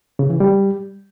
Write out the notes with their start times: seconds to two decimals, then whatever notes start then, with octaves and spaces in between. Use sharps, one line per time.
0.19 C#3
0.30 E3
0.40 G3